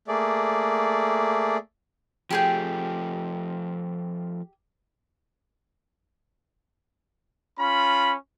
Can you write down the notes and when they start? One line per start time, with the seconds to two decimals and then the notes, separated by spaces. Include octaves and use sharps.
0.08 A3 A#3 G#4 D5
2.31 F3 A3 G4 G#4 G5
7.58 C#4 F4 B5